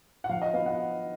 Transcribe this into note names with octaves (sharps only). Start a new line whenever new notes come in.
F#5
F3 F5
D#5
B3 F5
F#5